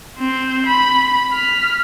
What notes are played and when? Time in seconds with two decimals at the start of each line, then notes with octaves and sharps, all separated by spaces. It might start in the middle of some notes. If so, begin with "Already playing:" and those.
0.19 C4 C5
0.66 B5
1.33 F6 B6